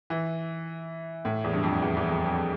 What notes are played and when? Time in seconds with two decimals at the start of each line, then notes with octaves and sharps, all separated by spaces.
0.10 E3
1.25 A2
1.44 E2
1.53 G2
1.63 F2
1.82 E2
1.97 E2
2.11 F2
2.25 F2